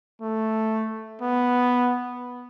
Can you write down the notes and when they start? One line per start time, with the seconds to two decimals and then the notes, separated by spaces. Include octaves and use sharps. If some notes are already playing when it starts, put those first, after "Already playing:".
0.21 A3
1.22 B3